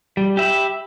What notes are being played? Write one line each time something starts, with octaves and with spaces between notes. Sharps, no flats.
G3
G4 E5 B5